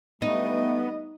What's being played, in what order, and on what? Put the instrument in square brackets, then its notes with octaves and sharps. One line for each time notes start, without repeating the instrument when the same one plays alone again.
[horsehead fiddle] G3 D#5 [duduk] A3 [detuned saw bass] B3 [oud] D#4